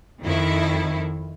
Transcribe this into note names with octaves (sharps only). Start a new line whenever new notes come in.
F2 D#3 E4